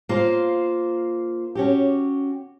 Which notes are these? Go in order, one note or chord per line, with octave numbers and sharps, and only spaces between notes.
A#3 F4 C5
C#4 F#4 G4